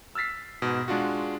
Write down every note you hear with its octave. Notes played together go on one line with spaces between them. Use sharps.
E6 F6 A6 B6 C7
G#2 B2
G#3 D4 F4 F#4